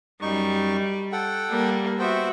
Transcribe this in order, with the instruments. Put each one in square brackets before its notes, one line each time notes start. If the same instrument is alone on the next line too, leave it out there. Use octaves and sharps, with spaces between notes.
[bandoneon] F#2 D#4 C#6 [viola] G3
[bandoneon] A4 F#5 G5
[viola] G3 A#3
[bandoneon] B3 C5 G5 [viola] F#4 E5